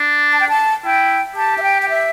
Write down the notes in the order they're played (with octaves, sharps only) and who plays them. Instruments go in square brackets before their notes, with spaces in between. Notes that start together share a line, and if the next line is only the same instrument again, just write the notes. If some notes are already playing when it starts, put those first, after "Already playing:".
Already playing: [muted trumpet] D4
[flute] A5
G5
A5
[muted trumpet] E4 [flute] G5
[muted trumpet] G4 [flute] A5
[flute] E5
G5
G5
E5